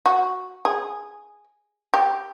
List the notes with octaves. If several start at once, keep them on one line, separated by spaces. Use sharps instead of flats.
F#4
G#4
G4